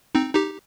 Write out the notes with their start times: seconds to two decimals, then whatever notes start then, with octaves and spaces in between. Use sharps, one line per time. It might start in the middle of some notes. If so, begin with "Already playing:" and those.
0.15 C4 D#4
0.35 D#4 G4